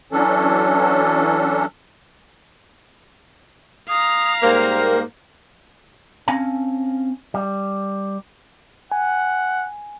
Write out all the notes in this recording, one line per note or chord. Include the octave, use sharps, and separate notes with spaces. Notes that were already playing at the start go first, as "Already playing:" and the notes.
E3 F#3 C#4 D4 A4
F5 A#5 D#6
G#2 G3 A#3 C5
C4 C#4 F5 G#5 A5
G3
F#5 G#5